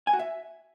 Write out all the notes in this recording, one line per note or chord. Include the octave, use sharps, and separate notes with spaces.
G#5
F#4
E5